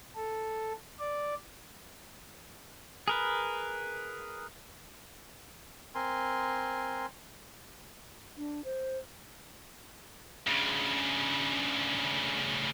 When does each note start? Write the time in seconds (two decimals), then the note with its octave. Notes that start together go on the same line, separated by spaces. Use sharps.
0.16 A4
0.99 D5
3.08 G#4 A#4 B4
5.95 C4 A#4 G#5 C6
8.37 D4
8.64 C5
10.47 D2 C#3